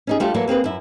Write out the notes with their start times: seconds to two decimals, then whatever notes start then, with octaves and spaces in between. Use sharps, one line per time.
0.07 C#4 D#4 G#4
0.20 G3 A3 D4 F4 G4
0.34 E3 F#3 A3 A#3
0.48 A#3 C4 G#4 B4
0.64 F#2 E4